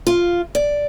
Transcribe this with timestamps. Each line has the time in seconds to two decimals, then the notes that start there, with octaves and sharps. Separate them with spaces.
0.07 F4
0.55 D5